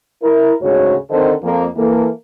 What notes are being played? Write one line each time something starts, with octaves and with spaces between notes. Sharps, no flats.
E4 A#4
D2 G#2 C#3 F#4 C#5
D3 D#3 C4 A4 C5 D#5
F2 A#3
E3 A#3 A4